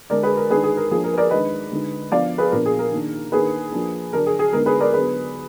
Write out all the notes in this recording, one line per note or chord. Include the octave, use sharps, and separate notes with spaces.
D3 G#3 D4 A#4 D5
G#4 B4
A#4
D#3 G#3 D4 G#4 B4
G#4
A#4
F3 A#3 D4 G#4
A#4
B4
A#4 D5
D#3 G#3 D4 B4 D#5
D3 G#3 D#4
F3 B3 D4 D5 F5
G#4 B4
A#2 F3 B3 D4 A#4
G#4
A#4
D#3 A#3 D4
D#3 A#3 D4 G#4 B4
F3 A#3 D4
D3 F#3 D4 A#4
G#4
G#4
D3 G#3 B3 D#4 A#4
G#4 B4
A#4 D5
D3 F#3 B3 G#4 B4